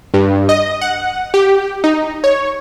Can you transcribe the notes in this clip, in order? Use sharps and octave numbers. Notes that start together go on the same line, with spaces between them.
G2
D#5
F#5
G4
D#4
C#5